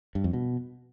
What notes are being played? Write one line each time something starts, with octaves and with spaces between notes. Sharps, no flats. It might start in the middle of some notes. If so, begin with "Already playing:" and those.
G2
F2
B2